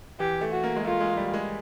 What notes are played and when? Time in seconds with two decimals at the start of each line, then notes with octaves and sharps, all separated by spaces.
0.20 E3 G4
0.41 A3
0.52 F#4
0.64 A#3
0.76 G#3
0.85 A3 F4
1.00 G#3
1.17 G3
1.34 G#3